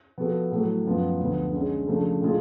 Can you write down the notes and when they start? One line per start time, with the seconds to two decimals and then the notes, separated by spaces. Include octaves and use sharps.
0.18 F3 B3 F#4 A4
0.51 A2 F#3 A3
0.85 F#2 F3 B3 F4
1.19 D2 D3 F3 B3
1.53 D3 G#3 C#4
1.87 C#3 F3 A3 D4
2.21 A2 G#3 D4 F4 G#4